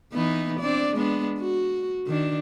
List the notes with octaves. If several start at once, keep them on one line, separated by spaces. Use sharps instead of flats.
E3 B3 D#4
C4 D4 D5
G#3 B3 D4
F#4
D#3 D4